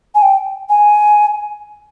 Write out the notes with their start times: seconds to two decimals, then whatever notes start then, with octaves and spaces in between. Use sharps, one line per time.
0.15 G#5
0.22 G5
0.69 G#5